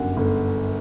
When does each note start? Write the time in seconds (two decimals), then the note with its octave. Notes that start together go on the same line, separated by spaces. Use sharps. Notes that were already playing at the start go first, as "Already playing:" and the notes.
Already playing: G1 F#2 F#5
0.17 G1